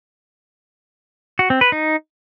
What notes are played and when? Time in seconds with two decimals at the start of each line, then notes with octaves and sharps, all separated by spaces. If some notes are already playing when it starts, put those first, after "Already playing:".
1.39 F#4
1.50 C4
1.61 B4
1.72 D#4